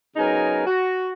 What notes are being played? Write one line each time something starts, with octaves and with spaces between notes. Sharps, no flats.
C#3 F#3 B3 D#4 A#4 G#5
F#4